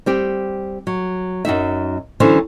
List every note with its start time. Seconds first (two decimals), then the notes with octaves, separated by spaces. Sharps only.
0.06 G3 C4 G4
0.87 F#3
1.45 F#2 F#3 D#4 E5
2.20 D3 E3 F#3 B3 C#4 C5